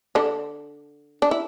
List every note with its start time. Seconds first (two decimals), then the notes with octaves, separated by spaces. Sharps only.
0.15 D3 D4
1.22 D4
1.31 E4